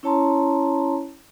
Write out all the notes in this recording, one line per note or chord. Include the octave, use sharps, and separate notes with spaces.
C#4 E4 C#5 A5 A#5 C6